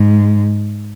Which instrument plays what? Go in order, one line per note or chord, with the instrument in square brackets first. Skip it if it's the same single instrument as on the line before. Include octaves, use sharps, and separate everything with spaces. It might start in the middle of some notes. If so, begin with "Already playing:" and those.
Already playing: [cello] G#2